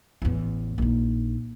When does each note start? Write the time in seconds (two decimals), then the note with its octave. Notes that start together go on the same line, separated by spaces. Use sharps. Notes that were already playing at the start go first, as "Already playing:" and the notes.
0.22 A1 E2
0.78 A#1 D#4